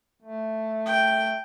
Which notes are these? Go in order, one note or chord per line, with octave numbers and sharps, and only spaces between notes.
A3
G5